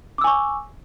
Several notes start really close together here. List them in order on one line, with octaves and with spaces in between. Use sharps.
D6 E6 G#5 C#6